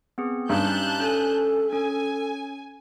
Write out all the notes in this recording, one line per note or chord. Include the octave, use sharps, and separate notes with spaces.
B3 C4 G#4
G2 C#4 D#4 G4 A5 F#6 G6
C#4 A4 G#5
C#4 G#5